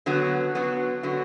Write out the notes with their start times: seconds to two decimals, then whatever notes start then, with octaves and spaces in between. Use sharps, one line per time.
0.06 D3 F#3 B3 F#4
0.55 D3 F#3 B3 F#4
1.03 D3 F#3 B3 F#4